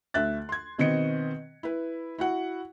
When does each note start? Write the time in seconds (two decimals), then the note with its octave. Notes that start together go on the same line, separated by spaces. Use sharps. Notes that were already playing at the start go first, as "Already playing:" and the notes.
0.14 D2 E5 F#6 A6
0.49 C6 G#6
0.78 B2 D#3 C4 B4 D#5 C#7
1.63 E4 B4
2.18 E4 F#4 F#5